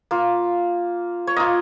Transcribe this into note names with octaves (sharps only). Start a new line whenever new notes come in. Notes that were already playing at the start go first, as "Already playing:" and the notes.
A#3 F4
C#5
A#3 F4 D#5